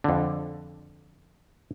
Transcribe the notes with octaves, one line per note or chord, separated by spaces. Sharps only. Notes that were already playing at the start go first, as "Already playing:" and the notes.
F2 D3